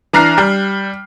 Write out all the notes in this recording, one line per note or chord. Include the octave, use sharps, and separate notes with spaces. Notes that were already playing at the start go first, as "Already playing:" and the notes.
E3 D4 A#5 F6 F#6 C7
G3